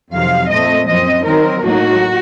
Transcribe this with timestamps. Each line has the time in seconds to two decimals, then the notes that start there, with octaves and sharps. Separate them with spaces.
0.12 F2 C3 D#3 F#3 F5
0.49 A#2 A3 C4 D#5
0.86 F#2 F3 C4 D#5
1.24 D#3 F#3 C4 D#4 A#4
1.61 A2 F#3 A#3 D#4 F#4